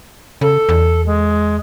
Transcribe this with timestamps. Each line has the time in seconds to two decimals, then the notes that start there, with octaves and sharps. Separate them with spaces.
0.41 C#3 A4
0.69 E2
1.06 G#3